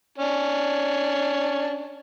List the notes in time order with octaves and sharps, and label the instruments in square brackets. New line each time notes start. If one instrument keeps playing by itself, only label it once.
[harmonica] C#4 D4